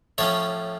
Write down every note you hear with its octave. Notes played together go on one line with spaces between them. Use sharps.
A2 F3 C#4 C#5